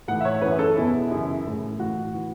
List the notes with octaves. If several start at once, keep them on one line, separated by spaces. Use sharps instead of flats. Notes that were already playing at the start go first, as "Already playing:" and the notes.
A2 E3 F#5
E5
C#5
F#2 E3 B4
A4
E2 B2 E4
F#2 C#3 E3
A2 E3
A2 E3 F#4
E3